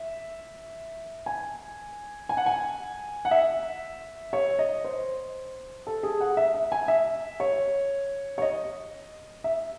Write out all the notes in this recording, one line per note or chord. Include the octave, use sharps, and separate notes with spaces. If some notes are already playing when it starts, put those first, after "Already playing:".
Already playing: E5
G#5
G#5
F#5
G#5
F#5
E5
C#5
D#5
C5
A4
G#4
F#5
E5
E5
G#5
E5
C#5
C#5
D#5
E5